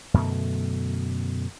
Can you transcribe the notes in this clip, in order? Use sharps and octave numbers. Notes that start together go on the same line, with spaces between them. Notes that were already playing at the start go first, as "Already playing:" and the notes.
F#2 B2 D3 A3